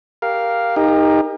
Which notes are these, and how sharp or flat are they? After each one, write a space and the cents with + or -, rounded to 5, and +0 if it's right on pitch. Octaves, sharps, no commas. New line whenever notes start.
G4 +0 A#4 +0 F5 +0
D#4 +5 G4 +40 A#4 +0